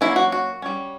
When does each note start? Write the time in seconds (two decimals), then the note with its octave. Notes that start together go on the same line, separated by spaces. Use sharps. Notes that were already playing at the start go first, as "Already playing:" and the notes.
0.01 F#3 A#3 C#4 E4
0.16 F#4
0.32 F#4
0.62 G3 C#4